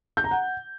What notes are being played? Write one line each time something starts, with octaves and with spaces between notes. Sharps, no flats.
G6
A#5
F#5